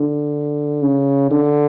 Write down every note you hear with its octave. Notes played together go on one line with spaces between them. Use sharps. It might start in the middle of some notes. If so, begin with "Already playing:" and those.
Already playing: D3
C#3
D3